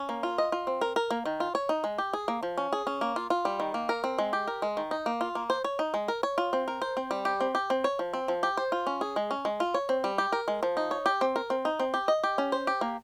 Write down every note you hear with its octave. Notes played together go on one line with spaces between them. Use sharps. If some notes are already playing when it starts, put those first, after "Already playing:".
Already playing: C#4
A#3
F4
D#5
F4
C4
A#4
A#4
A#3
D#3
F4
C#5
D#4
G#3
G4
G#4
A#3
F3
C#4
G#4
C#4
A#3
F4
F4
G3
D#3
A#3
A#4
C4
G#3
G4
A#4
G#3
D#3
D#4
A#3
F4
A#3
C5
C#5
D#4
G#3
A#4
C#5
F4
C4
A#4
C5
C4
G3
G4
C4
G4
C4
C#5
F3
C4
F3
G4
C5
F4
C#4
G#4
G#3
C#4
G#3
F4
C#5
C4
G3
G4
A#4
G#3
F3
D#4
C#5
G4
C4
A#4
C4
D#4
C4
G4
D#5
G4
C#4
C5
G4
A#3